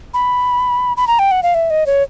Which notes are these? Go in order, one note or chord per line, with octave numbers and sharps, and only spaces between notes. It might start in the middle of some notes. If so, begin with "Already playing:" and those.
B5
B5
A#5
G5
F#5
F5
E5
D#5
C#5